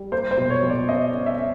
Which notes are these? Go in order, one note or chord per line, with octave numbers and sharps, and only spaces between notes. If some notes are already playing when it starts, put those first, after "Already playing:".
Already playing: G3
A#3 C5
C5
B2
C#5
B2
D5
C#4 D#5
C#4
E5
C#4